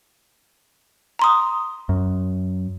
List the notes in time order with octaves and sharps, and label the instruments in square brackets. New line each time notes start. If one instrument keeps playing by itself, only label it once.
[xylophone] A#5 C6 D#6
[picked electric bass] F#2